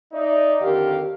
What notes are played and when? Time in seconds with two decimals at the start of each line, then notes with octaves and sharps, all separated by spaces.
0.13 D#4 D5 E5
0.61 F2 D3 D#3 G4 A#4 F5